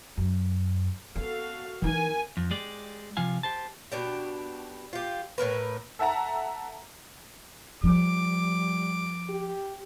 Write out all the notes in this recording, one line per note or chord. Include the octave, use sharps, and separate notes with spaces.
F#2
B3 F#4 A4 F5
E3 D#4 A#4 G#5
F2
G#3 G4 D5
C3 F3 F4 F5 G#5
G4 C5 A5
B2 D4 G4
F4 G4
A2 C#3 A#4 B4
A4 E5 F#5 A5 A#5
F3 G3 D6
G4